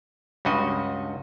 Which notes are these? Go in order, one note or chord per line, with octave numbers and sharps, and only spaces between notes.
C#2 G2 F#4 D#5